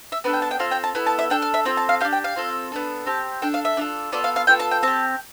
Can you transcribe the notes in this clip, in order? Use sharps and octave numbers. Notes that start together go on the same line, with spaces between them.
E5
B3 D4 A4 B4
G5
A5
G5
C4 F4 A4 F5
G5
A5
B3 E4 A4
A5
E5
D4 A4 G5
F5
E5
C4 F4 A4 G5
A5
F5
D4 G4 F5
G5
F5
C4 F4 A4
B3 D4 A4
C4 G4 A5
D4 A4 G5
F5
E5
D4 F4 A4
B3 F4 A4 D5
F5
F5
B3 F4 A4 G5
A5
G5
C4 G4 A5